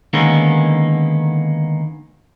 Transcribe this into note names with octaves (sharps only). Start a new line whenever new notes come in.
D3 D#3 G#3 A#3 B3 C#4